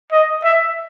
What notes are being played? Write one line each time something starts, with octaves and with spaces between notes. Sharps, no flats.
D#5
E5